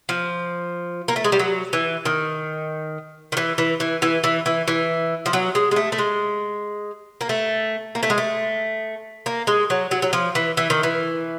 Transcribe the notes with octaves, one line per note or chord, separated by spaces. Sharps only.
F3
A#3
A3
G#3
G3
F#3
E3
D#3
D#3
E3
E3
E3
E3
E3
E3
E3
F3
F#3
G#3
G#3
A3
A3
G#3
A#3
A3
A#3
A3
G#3
A3
A#3
G#3
F#3
F#3
F#3
F3
E3
E3
D#3
E3